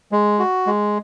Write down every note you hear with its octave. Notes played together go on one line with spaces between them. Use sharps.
G#3
F#4
G#3